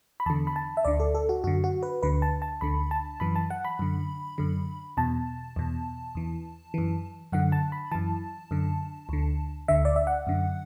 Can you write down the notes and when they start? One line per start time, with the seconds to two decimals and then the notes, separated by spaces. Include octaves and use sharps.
0.20 B5
0.26 E2 D3 A5
0.47 B5
0.56 A5
0.77 E5
0.85 D2 D3 D5
1.00 A4
1.15 A4
1.29 F#4
1.44 F#2 D3 F#4
1.64 F#4
1.83 B4
2.03 D2 D3 B4
2.22 A5
2.42 A5
2.61 D2 D3 B5
2.91 A5
3.20 F#2 E3 B5
3.36 A5
3.50 F#5
3.65 B5
3.79 F#2 D3
4.38 F#2 D3
4.97 E2 B2 A5
5.56 E2 B2
6.15 E2 E3
6.74 F#2 E3
7.32 F#2 D3 F#5
7.52 A5
7.72 B5
7.92 F#2 E3 A5
8.51 F#2 D3
9.09 D2 D3
9.68 D2 D3 E5
9.85 D5
9.96 E5
10.07 F#5
10.27 F#2 D3